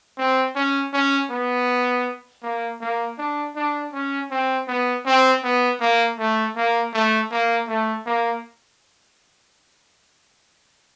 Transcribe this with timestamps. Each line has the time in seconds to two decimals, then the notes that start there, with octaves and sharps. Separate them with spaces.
0.18 C4
0.56 C#4
0.93 C#4
1.30 B3
2.43 A#3
2.81 A#3
3.18 D4
3.56 D4
3.93 C#4
4.31 C4
4.68 B3
5.06 C4
5.44 B3
5.81 A#3
6.18 A3
6.56 A#3
6.94 A3
7.31 A#3
7.68 A3
8.06 A#3